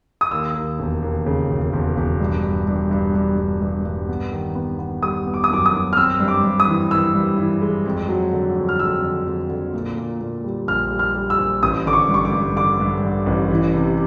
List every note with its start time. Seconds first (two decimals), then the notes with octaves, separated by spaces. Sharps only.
0.21 D#6
0.31 D#2 E6
0.55 D#2
0.79 E1
1.03 D#2
1.26 C#3
1.50 E1
1.73 E1
1.97 E1
2.20 G2
2.44 G2
2.68 G2
2.91 G2
3.15 G2
3.39 G2
3.61 G2
3.86 G2
4.08 B3
4.32 D#3
4.55 B3
4.79 B3
5.03 G3 D#6
5.26 B3
5.34 D6
5.44 D#6
5.50 F#2 D6
5.66 D#6
5.73 F#2
5.93 F6
5.97 C4 E6
6.20 G2
6.28 D6
6.44 G2
6.60 D#6
6.67 E3
6.91 E3 E6
7.15 G2
7.38 E3
7.62 G#3
7.86 F2
8.09 F#3
8.33 D3
8.55 F2
8.69 F6
8.80 F2 E6
9.02 D3
9.26 F2
9.50 D3
9.73 A#2
9.97 A#2
10.21 A#2
10.44 G3
10.67 A#1 F6
10.91 G3
10.99 F6
11.14 G3
11.30 E6
11.39 A#1
11.63 A1 D#6
11.86 D3 D6
11.93 C#6
12.09 G2
12.14 C#6
12.25 D6
12.33 G2
12.56 D3 D6
12.80 G2
13.04 D3
13.26 A1
13.50 E3
13.74 C3